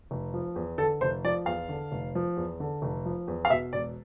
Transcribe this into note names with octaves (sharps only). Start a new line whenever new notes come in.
F1
F3
E2
D3 A4
F1 C5
F3 D5
E2 F5
D3
F1
F3
E2
D3
F1
F3
E2
F5
B2 E5
E1 D5